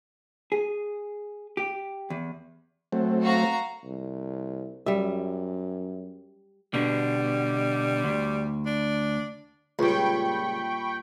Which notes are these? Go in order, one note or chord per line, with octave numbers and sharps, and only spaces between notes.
G#4
G4
E2
F#3 A3 C4
F#4 F5 A#5
C2
F#2 G3 E5
B2 D3 G3
D2
D4
C#2 A#2 G3 G5 B5 C#6